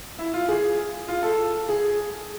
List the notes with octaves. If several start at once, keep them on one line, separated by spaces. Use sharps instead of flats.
E4
F4
G#4
F4
A4
G#4